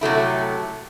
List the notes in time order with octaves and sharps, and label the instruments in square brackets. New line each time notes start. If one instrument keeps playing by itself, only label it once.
[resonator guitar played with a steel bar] C3 F#3 A3 E4